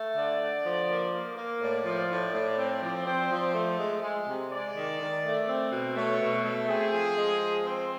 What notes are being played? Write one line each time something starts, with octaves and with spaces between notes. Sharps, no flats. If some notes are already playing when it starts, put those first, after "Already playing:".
Already playing: A3
D3 D5
D3
F3
A#3
A#3
A#3
A2 D5
F3
A2
A2
C4
F3
C4
F3
A3
G#3
G#3
C3
G#3 D5
D#3
D#3
A3
C4
B2
A3 C#5
B2
A3
C4 G#4
F3
G#3
F3
C4